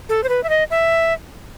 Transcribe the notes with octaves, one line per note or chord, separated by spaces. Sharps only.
A4
C5
B4
E5
D#5
E5